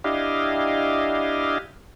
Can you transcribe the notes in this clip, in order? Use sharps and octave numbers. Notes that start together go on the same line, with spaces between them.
D4 E4 G4 D#5 F5